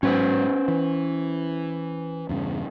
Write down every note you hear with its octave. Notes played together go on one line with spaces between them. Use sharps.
A1 G#2 F#3 C#4 B4 C5
E3
E2 G2 C#3